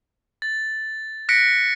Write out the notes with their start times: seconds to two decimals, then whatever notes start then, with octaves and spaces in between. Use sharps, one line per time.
0.42 A6
1.29 F#6 A#6 B6 C#7 D7